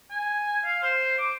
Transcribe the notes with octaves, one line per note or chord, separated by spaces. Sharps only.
G#5
F5
C5
D6